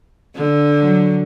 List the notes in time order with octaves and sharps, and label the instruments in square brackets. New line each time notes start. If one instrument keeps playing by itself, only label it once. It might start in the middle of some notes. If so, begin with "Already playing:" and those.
[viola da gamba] D3
[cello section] F#3